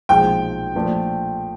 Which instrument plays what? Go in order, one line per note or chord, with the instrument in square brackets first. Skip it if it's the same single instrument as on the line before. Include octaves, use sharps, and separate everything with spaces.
[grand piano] B1 A#2 F3 G#3 [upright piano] G5
[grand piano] A#2 F3 A3 D4